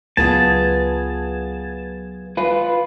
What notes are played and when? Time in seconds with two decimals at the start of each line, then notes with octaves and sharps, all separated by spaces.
0.17 C#2 F#3 B3 F4 G#4 A5 G#6
2.37 F4 B4